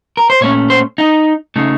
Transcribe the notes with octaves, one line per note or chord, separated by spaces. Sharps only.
A#4
C5
A#2 A3 C#4 C#5
C5
D#4
C#3 A3 D#4